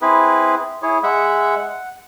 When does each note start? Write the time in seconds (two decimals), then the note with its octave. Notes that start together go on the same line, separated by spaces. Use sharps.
0.02 C4 E4 G#4 B4
0.82 E4 G#4 C#5
1.03 G#3 E5 F#5
1.59 F#5